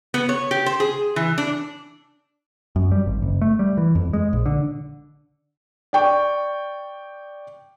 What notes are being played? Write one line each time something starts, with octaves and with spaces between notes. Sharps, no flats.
B3
C#5
G4
C5
G#4
E3
D4
F#2
G3
G#1
F#1
A3
G3
E3
F2
G#3
A#1
D3
D5 G5 C#6